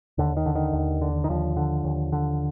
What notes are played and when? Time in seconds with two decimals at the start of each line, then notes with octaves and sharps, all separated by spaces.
0.18 D#2 D3
0.37 D#3
0.46 D3
0.55 D#3
0.73 D#2
1.02 D3
1.24 D#3
1.30 D#2 F3
1.57 D3
1.84 D#2
2.12 D3